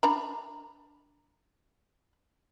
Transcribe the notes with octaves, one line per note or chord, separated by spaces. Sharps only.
D4 A#5 B5